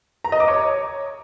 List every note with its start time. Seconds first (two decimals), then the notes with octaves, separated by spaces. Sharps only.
0.24 A#5
0.32 D#5
0.40 D6
0.48 C#5